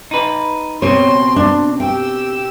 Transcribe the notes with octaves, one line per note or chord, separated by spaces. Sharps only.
D#4 B4
B2 C4 C#5 C6
D4
G4 G5 E6